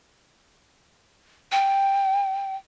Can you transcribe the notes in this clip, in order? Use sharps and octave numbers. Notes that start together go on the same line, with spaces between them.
G5